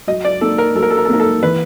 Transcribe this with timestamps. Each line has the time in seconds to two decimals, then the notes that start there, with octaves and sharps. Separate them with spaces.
0.07 F#3 D#5
0.25 D5
0.41 A#3 D#4 A4
0.58 A#4
0.75 F#3 A4
0.83 A#4
0.90 A4
0.98 A#4
1.05 A4
1.09 A#3 D#4 A#4
1.20 A4
1.42 E3 B4